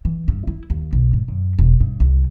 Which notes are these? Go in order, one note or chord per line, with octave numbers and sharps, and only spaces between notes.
E3
G2
E4
D#2
B1
G#2
F#2
E1
G2
C2